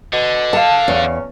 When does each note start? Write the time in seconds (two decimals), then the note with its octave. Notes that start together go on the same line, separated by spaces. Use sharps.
0.13 B2 D3
0.53 F5 A5
0.88 E2 C#4